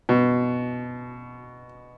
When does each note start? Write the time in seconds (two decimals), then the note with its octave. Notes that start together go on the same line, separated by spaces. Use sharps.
0.09 B2